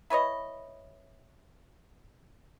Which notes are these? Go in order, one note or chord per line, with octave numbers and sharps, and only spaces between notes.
E4 B4 C#5 D#5